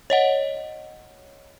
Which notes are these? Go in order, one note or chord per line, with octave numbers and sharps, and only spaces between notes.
C#5 D#5 F#5